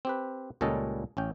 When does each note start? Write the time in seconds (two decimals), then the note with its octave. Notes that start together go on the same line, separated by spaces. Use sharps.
0.05 C4 G4 B4
0.61 C#2 A#2 G3 C#4 A4 D#5
1.17 A1 C#4 G5